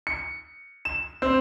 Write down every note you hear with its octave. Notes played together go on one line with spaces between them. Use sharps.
C#7
E7
C4